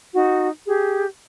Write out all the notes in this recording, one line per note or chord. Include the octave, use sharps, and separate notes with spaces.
D#4 F#4
G4 G#4